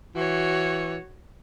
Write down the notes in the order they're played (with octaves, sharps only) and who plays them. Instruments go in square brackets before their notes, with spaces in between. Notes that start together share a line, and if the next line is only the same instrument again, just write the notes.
[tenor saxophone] E3 [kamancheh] F#4 C#5